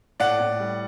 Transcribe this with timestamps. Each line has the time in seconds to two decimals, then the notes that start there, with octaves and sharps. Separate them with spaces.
0.20 A2 D5 F#5
0.40 A2
0.60 G3